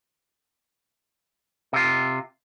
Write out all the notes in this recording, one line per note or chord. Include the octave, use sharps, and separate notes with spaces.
C3 F4